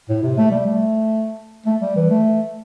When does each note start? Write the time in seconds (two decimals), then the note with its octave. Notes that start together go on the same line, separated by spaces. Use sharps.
0.09 A2
0.23 C3
0.38 A3
0.51 G3
0.66 A3
1.66 A3
1.81 G3
1.96 E3
2.10 A3